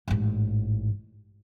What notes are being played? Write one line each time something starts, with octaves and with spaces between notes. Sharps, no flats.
A1 G#2